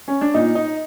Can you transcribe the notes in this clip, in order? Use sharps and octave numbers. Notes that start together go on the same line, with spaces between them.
C#4
D4
A#2 D#4
D#4